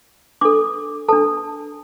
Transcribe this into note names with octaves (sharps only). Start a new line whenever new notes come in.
D4 A4 D6
D4 A4 A5